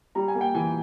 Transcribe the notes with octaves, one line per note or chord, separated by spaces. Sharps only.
G3 A#5
G#5
A#3
G5
E3 G#5